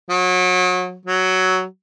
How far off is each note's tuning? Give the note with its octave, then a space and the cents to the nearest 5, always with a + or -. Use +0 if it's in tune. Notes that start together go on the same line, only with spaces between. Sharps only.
F#3 -30
F#3 +10